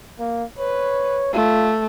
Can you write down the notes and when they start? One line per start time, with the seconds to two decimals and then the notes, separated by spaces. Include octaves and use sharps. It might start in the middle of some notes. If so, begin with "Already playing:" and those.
0.19 A#3
0.59 B4 C#5
1.33 A3 F4